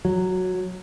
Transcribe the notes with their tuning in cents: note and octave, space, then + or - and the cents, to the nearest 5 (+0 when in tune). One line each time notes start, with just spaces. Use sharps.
F#3 -5